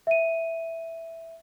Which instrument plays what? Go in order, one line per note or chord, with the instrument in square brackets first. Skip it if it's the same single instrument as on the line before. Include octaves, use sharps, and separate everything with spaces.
[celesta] E5 D#7